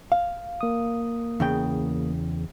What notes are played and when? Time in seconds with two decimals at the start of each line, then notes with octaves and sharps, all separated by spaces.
0.12 F5
0.61 A#3 D#6
1.40 E2 C#3 G5